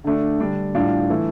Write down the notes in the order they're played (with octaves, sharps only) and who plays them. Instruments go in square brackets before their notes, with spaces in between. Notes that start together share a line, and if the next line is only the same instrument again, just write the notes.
[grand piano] D3 A3 D4
D3 G3 D4
A2 G3 D4 F4
E3 A3